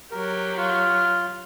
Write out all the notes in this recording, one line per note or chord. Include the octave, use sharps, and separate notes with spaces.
F#3 G4 A#4
F4 F6